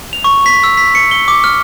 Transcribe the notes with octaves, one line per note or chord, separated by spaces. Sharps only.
F7
C#6
B6
E6
B6
C#7
G7
D6
F6